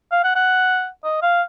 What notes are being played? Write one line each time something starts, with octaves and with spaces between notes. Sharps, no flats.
F5
F#5
F#5
D#5
F5